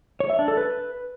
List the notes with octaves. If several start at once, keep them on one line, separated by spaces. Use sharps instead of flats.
C#5
E5
D4
A4
B4